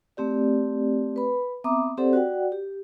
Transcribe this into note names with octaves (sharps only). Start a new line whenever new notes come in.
A3 C4 G4 D5
B4 B5
B3 C4 E5 A#5 D6 D#6
C4 G4 A4 C5 D5 F#5
F#4 D5 F#5 G5
G4